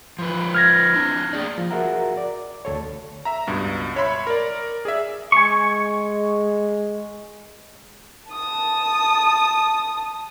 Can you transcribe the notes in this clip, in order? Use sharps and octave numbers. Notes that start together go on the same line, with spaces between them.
F3 F4 B4
F6 G#6 A#6
D4 E4
A#3 G#4 D5
F3
F#4 G#4 A#4 E5 F#5 A#5
D5
D2 A4 C#5
E5 A#5
C#2 G2 B2
C#5 E5 B5 C6
A#4 D5
G#4 D5 E5
G#3 G#5 C#6
A5 D#6